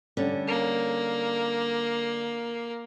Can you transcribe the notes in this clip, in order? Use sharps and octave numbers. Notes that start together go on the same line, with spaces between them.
D3 G3 C#4
A#3